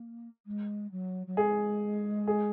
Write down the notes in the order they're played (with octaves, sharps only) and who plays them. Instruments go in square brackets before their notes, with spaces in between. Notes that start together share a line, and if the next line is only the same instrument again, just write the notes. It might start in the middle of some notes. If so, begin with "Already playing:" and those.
Already playing: [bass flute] A#3
G#3
F#3
F#3
[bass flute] G#3 [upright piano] G#4
[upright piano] G#4